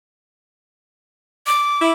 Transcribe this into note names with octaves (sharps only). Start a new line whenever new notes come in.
D6
E4